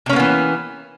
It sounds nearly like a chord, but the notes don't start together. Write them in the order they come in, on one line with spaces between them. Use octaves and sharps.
C3 C#4 A#3 B3 E3